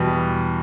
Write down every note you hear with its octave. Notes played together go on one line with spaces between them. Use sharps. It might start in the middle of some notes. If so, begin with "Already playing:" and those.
Already playing: E2 B2 G3 B4